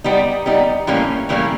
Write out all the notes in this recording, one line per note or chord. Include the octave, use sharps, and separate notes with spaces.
G3 B3 D#4
G3 B3 D#4
A2 E3 G3 A#3 C#4
A2 E3 G3 A#3 C#4